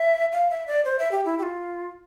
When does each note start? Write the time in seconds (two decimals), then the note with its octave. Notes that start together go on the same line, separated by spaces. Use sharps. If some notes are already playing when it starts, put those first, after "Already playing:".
Already playing: E5
0.32 F5
0.51 E5
0.67 D5
0.85 C5
0.99 E5
1.12 G4
1.26 E4
1.39 G4
1.43 F4